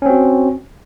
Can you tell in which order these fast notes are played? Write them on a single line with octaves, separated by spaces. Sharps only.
C#4 C4 F#4